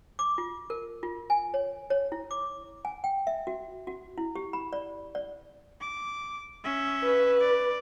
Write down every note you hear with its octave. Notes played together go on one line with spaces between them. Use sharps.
D6
F4
A#4
F4
G#5
C#5
C#5
E4
D6
G#5
G5
E5
F#4
F#4
E4
G4
B5
D5
D5
D6
C#4 E5
B4
D5